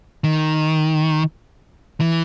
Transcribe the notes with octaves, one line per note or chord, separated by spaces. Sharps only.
D#3
E3